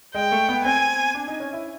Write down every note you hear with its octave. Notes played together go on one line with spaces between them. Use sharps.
G#3 G5
A3
B3
C4 G#5
D4
D#4
C#4
E4